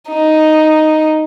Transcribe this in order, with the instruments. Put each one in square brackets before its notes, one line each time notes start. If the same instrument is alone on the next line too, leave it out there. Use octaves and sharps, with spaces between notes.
[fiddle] D#4